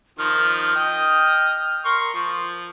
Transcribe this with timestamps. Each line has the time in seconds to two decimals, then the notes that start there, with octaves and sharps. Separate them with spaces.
0.19 D#3 F3 F6
0.76 D#5 G5 D#6
1.85 A#4 C6 C#6
2.14 F3